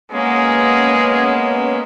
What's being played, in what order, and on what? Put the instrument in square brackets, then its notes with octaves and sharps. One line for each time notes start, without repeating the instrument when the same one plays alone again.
[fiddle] G#3 A#3 [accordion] B3 C#4 [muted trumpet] G#4